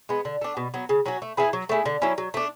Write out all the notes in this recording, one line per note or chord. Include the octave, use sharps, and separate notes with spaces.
G#3 B3
D3
A3 D4
B2
F#3 B3
C#3
F#3 C#4 F#4
A3
E4 G#4 B4
F#3
A3 E4 G#4
D3
F#3 C#4 E4
F#3
A3 D4